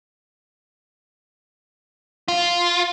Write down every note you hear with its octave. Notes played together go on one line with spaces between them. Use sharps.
F4